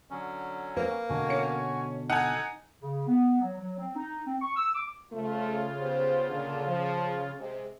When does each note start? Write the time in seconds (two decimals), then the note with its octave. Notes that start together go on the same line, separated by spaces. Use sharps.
0.10 D3 F#3 C#4
0.77 A#3 B4
1.09 B2 D3 F#4 G#5
1.29 C#4 C#7
2.10 D#4 A4 F#5 G#5
2.82 C#3
3.07 B3
3.41 F#3
3.58 F#3
3.78 C4
3.96 D#4
4.26 C4
4.42 C#6
4.56 E6
4.75 D6
5.12 F2 C#3 A3 F4
5.80 B3 G4 C5
6.30 A#2 D3
6.67 F3
7.38 C3 G#3